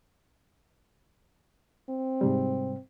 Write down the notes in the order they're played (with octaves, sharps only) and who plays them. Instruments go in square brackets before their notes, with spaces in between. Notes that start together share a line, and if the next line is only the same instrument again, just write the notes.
[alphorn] C4
[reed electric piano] G#2 C3 G3